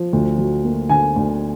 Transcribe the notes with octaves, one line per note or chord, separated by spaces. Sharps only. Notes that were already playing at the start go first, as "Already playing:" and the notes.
Already playing: F3
D2
F#3
A#3
D3 G#5
D2